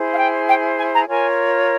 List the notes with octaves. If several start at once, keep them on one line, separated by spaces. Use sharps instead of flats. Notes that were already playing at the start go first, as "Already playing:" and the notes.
Already playing: E4 G#4 C5
F5
G5
G5
G#5
A#5
F4 A#4 C#5 G#5